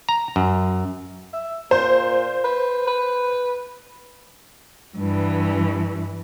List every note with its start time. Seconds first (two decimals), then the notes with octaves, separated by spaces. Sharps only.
0.09 A#5
0.36 F#2
1.33 E5
1.71 A#2 C5
2.44 B4
2.87 B4
4.98 G2 E3